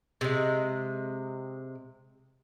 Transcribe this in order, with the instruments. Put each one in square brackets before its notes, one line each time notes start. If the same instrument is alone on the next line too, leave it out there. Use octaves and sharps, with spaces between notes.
[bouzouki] C3 G#3